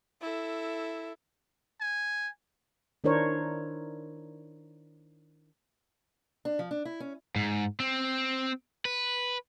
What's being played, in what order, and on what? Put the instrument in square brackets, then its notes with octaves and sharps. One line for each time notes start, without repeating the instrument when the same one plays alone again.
[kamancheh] E4 A4
[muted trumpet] G#5
[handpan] D#3 D4 E4 A#4 C5 C#5
[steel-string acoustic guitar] D4
F3
D4
E4
C#4
[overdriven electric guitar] G#2
C4
B4